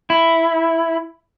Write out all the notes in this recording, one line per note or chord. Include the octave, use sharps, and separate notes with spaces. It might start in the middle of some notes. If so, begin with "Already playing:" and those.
E4